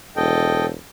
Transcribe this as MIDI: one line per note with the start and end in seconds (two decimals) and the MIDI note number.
0.16 0.73 28
0.16 0.66 69
0.16 0.66 75
0.16 0.66 79